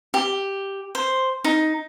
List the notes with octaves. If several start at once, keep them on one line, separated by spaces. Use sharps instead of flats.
G4
C5
D#4